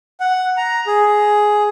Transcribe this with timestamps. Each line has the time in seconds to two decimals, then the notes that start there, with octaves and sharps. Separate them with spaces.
0.20 F#5
0.57 A#5
0.87 G#4